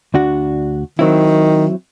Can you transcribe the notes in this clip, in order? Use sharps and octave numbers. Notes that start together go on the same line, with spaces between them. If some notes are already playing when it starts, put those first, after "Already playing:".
D2 D4 F#4
D#3 F#3 C4 E4